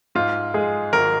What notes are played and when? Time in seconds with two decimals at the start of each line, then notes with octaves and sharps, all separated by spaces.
0.15 G#2 F4
0.54 G#3 G#4
0.93 G#1 A#4